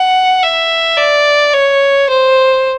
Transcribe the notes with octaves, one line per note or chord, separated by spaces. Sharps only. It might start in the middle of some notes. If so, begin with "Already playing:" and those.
Already playing: F#5
E5
D5
C#5
C5